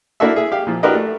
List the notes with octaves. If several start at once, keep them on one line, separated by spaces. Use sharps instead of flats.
A#3 D4 E4 F#4 A4 E5
G#4 E5
G4 F5
A#2 F3
D4 F#4 G4 A#4 B4 D#5
A3